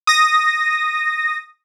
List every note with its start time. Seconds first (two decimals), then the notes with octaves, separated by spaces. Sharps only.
0.07 D#6 A#6